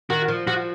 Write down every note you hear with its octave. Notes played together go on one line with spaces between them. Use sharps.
D#3 F#4
F3
F3 F#4